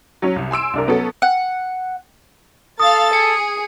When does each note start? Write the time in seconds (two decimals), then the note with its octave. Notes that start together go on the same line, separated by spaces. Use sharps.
0.22 F#3 C#4
0.36 C2
0.51 G#5 C6 E6 D7
0.74 C2 D4 A#4
0.87 F#3 B3 C#4 A4
1.22 F#5
2.80 A4 F5 D#6 A6
3.13 G#4 C#7